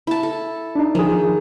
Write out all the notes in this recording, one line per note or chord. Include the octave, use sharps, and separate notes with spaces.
E4 A5
A4
D4 D#4
D#3 F3 G#4